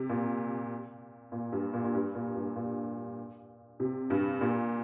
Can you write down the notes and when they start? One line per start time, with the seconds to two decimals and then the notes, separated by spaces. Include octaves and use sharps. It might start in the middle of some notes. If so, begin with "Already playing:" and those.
Already playing: C3
0.09 A#2
1.32 A#2
1.52 G2
1.73 A#2
1.84 A#2
1.94 G2
2.15 A#2
2.36 G2
2.56 A#2
3.80 C3
4.10 G2
4.41 A#2